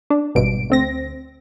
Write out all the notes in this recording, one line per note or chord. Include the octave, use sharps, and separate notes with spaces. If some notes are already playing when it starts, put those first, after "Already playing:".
D4
G#1 G2 B2 D7
D2 C4 A#6